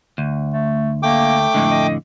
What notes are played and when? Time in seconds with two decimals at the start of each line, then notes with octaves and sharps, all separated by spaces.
0.18 D2
0.54 A3
1.03 A3 A#3 G5 D6
1.54 F2 A2 D3 G#3
1.71 D#5